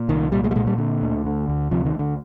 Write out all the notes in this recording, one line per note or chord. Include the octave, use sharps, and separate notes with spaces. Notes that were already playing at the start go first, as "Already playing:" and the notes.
Already playing: A#2
C2 D#3
A#2 G3
G#3
G3
A#2 G#3
G3
D3
D2
D3
D2
C3 F3
D#3
D2 D3